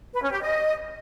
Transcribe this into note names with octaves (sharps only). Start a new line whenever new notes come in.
B4
C#4
G4
D#5